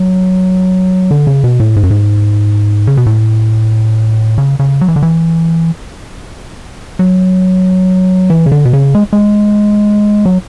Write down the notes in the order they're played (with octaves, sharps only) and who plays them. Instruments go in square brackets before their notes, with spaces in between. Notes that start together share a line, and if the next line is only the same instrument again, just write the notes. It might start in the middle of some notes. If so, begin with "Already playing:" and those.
Already playing: [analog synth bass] F#3
D3
C#3
B2
A2
G#2
F#2
G#2
C#3
B2
A2
C#3
C#3
F#3
E3
D3
E3
F#3
E3
C#3
D3
B2
C#3
G#3
G#3
F#3